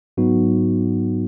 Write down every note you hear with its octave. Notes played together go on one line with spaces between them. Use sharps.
G#2 F#3 B3 D#4 F#4